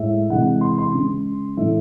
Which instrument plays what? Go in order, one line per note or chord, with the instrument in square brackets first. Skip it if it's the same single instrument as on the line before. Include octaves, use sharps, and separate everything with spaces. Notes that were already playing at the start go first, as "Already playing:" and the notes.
Already playing: [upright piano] A2 G#3 E5
C3 E3 G#3 F#5
C6
C6
C#3 G#3
A2 E3 A3 E5